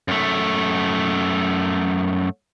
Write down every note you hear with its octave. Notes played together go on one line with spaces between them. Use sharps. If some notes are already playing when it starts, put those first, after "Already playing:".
F#2 A3